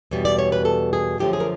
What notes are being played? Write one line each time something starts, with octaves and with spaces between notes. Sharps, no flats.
E2 B2 G3
D5
C#5
B4
A4
G#4
F#2 D3 F3 A3 G4
G#4
A#4